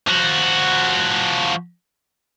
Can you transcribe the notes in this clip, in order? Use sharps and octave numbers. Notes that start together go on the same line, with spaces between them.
F3 F#4